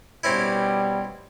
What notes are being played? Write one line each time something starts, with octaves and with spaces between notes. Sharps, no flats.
B2 G3 C4 C#4 E4